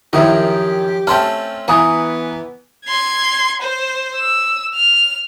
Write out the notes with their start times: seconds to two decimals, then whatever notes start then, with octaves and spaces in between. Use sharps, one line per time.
0.13 F#2 D#3 F3 E4 G4 A#4
1.07 A3 C4 C#4 G5 A5 C6 F6
1.68 E3 B3 G#5 A#5 D#6
2.86 C6 G#6
3.61 C5
4.16 E6
4.75 F6